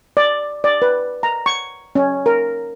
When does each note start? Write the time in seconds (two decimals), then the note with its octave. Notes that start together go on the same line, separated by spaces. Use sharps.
0.17 D5
0.64 D5
0.82 B4
1.23 A#5
1.46 C#6
1.95 C#4
2.26 A#4